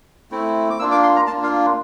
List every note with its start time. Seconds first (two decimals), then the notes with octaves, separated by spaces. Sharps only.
0.31 A3 C4 E4
0.70 D6
0.79 A#3 D4 F4 E6
0.91 D6
1.03 C6
1.16 A#5
1.27 A#3 D4 F4 A5
1.43 F5